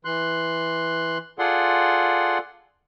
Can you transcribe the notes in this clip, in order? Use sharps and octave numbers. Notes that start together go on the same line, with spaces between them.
E3 C6 F#6
F4 G#4 A4 D5 F#5 C6